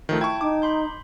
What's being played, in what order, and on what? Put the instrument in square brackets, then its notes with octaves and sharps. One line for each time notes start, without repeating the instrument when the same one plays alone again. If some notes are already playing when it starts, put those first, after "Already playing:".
[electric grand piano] D#3 F3 A3
[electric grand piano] E4 C#6 [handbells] G5 A5 G#6
[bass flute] D#4 [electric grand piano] D6
[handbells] B5 C6 G6